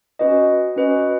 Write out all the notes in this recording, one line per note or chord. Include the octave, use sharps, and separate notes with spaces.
C#4 F#4 B4 D#5
C#4 F#4 B4 D#5